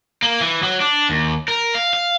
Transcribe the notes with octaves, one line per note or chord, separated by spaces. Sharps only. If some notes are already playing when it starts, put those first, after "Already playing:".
A#3
E3
F#3
D4
D#2
A#4
F5
F5